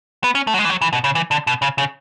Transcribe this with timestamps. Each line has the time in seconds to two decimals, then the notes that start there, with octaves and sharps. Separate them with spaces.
0.24 B3
0.35 C#4
0.47 A3
0.54 F#3
0.59 G#3
0.65 E3
0.70 F#3
0.81 E3
0.93 B2
1.04 C#3
1.15 E3
1.31 D3
1.47 B2
1.62 C#3
1.78 C#3